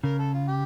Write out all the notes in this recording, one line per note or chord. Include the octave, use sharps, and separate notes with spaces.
C#3 A#4
A4
F4
G4